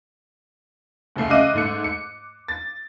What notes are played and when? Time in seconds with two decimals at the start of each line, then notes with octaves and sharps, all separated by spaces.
1.16 F1 C#2 A3 C7
1.30 C#3 D#5 E5 D6 F#6 D#7
1.53 G#2 A3 C#7
1.84 C#7
2.48 A6